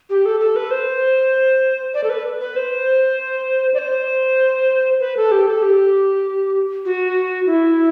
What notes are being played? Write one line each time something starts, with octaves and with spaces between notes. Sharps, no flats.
G4
A4
A4
B4
C5
D5
A4
B4
B4
C5
D5
C5
B4
A4
G4
A4
G4
F#4
E4